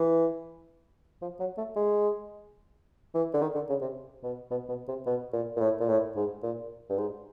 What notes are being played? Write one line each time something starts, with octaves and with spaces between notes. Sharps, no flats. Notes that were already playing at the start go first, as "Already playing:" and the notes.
Already playing: E3
F3
F#3
A3
G#3
E3
D3
D#3
D3
C#3
C3
B2
B2
B2
C3
B2
A#2
A#2
A2
A#2
A2
G#2
A#2
G2
G#2